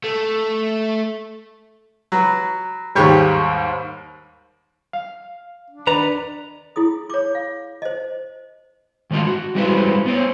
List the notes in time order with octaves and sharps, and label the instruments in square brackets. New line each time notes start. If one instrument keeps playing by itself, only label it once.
[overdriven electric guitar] A3
[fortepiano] F#3 B4
[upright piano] D#2 G#2 G3 [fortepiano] G#3 G4 C#5
[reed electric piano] F5
[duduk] D4
[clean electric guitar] D#3 B3 A#5 [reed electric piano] B4 [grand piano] D5
[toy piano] E4 G#4 D#6
C#5 D6
F5
C5 D#5
[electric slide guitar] D#3 G#3 A3 D4 F4
F#4
G3 G#3 C#4 E4 B4 C5
B3 C5 C#5